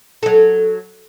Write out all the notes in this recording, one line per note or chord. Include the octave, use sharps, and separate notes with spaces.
F#3 A4